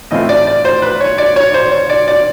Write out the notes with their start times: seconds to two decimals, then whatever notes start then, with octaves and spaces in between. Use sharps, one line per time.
0.11 A2 E3 A3 C4 F4 D#5
0.29 D5
0.47 D5
0.65 C5
0.82 B4
1.01 C#5
1.18 D5
1.36 C#5
1.54 C5
1.72 C#5
1.90 D5
2.08 D5